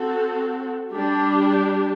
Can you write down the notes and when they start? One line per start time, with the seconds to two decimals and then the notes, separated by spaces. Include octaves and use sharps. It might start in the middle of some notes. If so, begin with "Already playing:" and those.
Already playing: C4 F#4 A4
0.92 G3 D4 G4